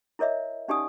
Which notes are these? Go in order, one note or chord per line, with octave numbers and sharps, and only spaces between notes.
E4 A#4 C#5 D#5 E5
C#4 D#4 G4 D5 G#5 D#6